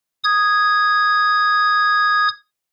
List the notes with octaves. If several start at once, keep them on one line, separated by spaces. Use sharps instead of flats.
D#6 G#6